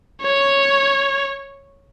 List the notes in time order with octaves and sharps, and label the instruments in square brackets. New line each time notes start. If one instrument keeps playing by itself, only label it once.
[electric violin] C#5